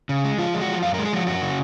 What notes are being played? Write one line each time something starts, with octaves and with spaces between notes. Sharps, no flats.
C#3
G#3
F3 F4
G#3
F#4
F3
F#2 F5
A#4
G#3
G#4
F3 F#4
F#2 F#4
C#3